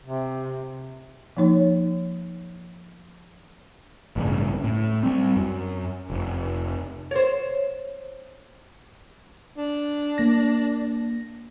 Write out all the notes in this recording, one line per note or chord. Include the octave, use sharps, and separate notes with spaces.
C3
F3 A#3 D#4 C#5
A1 G2 C#3
A2
G3 C4
F#2
F1
C5 C#5
D4
A#3 A#6